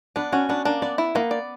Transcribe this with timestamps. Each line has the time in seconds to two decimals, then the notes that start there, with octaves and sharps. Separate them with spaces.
0.16 B3 D4
0.32 C#4 F#4
0.49 B3 D4
0.65 A#3 D4
0.82 B3 D5
0.98 E4
1.15 A#3 B3
1.31 D5